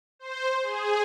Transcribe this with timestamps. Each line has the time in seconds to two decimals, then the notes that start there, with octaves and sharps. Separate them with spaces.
0.19 C5
0.63 G#4